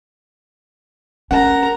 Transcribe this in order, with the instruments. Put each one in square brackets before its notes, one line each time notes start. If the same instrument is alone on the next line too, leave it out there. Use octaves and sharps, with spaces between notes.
[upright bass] C#4 [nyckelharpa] A#4 A#5 [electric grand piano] F#5